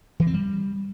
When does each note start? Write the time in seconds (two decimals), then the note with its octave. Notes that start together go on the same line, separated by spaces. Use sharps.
0.20 E3
0.27 C4
0.34 G3